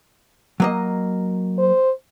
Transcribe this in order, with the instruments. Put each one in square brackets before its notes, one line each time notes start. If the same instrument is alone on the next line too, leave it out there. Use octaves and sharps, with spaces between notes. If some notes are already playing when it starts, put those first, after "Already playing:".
[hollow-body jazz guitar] F#3 A#3 D#5
[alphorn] C5